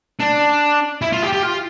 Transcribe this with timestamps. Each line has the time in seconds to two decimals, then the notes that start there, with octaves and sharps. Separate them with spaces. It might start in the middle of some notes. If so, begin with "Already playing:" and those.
0.20 D4
1.02 E4
1.12 F4
1.22 G4
1.33 G4
1.43 F4